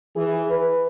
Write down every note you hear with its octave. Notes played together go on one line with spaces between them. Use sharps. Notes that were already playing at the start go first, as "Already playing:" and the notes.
E3 G#4
B4